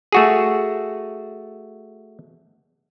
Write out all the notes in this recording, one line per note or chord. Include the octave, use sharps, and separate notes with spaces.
A3 F#4 G#4